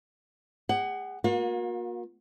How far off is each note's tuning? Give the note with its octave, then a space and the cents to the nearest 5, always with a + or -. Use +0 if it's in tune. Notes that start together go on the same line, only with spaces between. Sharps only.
G#4 -35 F#5 +20
A#3 +30 F#4 -45